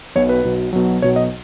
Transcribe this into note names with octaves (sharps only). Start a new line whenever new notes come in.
B1 B2 F#3 C#5
B4
B1 B2 F#3
B1 B2 F#3
B1 B2 F#3 C#5
D#5